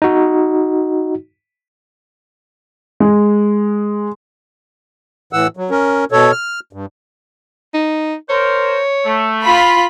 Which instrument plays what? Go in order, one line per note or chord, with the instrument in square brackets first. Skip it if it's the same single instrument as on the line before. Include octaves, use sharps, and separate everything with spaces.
[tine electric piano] D#4 F#4
[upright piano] G#3
[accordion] A2 E3 F#5 E6
F#3
C#4 A#4
B2 A4 C#5
F6
G2
[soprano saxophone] D#4
[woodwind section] A#4 C5 [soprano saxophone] C#5
[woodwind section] A3
[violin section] F4 B5